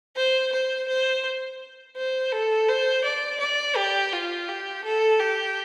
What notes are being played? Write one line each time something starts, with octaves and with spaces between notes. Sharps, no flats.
C5
C5
C5
C5
A4
C5
D5
D5
G4
F4
G4
A4
G4